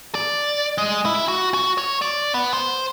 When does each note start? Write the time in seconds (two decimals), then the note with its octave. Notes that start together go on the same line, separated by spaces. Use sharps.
0.15 D5
0.78 G#3
1.06 E4
1.28 F#4
1.54 F#4
1.78 C#5
2.02 D5
2.34 B3
2.53 C5